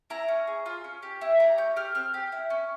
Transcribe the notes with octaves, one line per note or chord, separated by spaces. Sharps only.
E4 A#5
C#4
G#4
F4
C#4
G4
E4
G4 A#5
C#4 G6
G4 F6
C4 F6
G4
E4
C#4